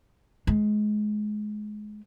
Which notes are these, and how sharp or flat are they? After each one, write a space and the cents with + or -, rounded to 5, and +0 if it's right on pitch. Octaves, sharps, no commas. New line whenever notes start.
G#3 +25